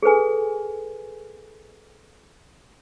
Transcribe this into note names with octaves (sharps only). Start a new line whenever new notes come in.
G#4 A4 B4 G#5